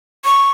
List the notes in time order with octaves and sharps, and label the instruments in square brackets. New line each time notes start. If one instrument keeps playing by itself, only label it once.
[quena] C#6